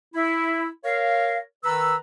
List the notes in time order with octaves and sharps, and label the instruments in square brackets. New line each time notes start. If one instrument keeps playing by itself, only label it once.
[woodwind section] E4
A#4 C#5 F5
D#3 B4 A#5 E6